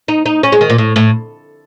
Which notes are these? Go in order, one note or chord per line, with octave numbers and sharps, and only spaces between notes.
D#4
D#4
C#4
G#3
D#3
A#2
A2
A2